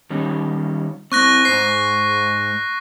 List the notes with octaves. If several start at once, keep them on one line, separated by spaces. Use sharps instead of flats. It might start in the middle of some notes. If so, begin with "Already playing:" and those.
D#3 G3 C#4
C4 E4 C#6 F#6 A#6
G#2 C5 C7